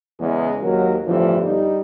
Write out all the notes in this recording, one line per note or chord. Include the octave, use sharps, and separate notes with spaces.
E2 C#3 G#3 G#4
D#2 G#2 F#3 A#4
G1 A2 E3 F3
G3 D#4